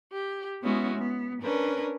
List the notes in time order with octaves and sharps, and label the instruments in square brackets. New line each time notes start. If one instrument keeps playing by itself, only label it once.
[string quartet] G4
G#3 B3 C#4 E4 F#4
B3
C#4 D4 A#4 B4